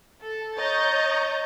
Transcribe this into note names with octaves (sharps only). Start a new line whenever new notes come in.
A4
C#5 D#5 A#5 C#6 G6 A6